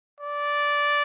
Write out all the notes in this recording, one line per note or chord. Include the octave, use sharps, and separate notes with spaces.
D5